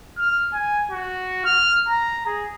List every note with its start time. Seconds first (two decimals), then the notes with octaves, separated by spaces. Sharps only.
0.18 F6
0.53 G#5
0.91 F#4
1.45 F6
1.88 A#5
2.26 G#4